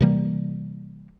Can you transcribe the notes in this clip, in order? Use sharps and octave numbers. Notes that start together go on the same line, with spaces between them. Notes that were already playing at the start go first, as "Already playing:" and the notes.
C3 E3 G3 A#3